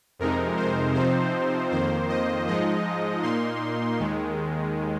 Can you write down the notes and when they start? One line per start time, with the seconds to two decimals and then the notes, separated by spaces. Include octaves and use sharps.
0.19 F2 C3 G#3 D#4 A#4
0.57 C5
0.95 C3 F3 C4 D#4 C5
1.71 F2 D#3 A#3 C5
2.09 D#5
2.48 G#2 F3 G#3 D#4 D#5
3.23 A#2 A#3 D#4 C6
3.99 D#2 D#3 G#3